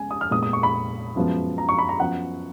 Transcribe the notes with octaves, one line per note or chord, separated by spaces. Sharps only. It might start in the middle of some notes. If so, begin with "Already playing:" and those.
Already playing: C#3 G#3 B3 G#5
D#6
F6
A#2 G#3 B3 D#6
D#6
C#6
B5
F#2 F3 G#3 B3
A#5
C#6
B5
A#5
F#2 F3 B3 F#5